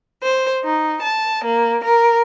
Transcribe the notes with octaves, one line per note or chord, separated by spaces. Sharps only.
C5
D#4
A5
A#3
A#4